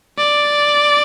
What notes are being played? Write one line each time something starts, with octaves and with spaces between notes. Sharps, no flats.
D5